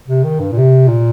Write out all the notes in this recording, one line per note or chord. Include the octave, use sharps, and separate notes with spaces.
C3
D#3
G2
A#2
C3
A#2